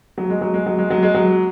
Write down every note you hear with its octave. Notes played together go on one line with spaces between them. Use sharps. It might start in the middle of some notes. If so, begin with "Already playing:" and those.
F#3
G#3
F#3
G#3
F#3
G#3
F#3
G#3
F#3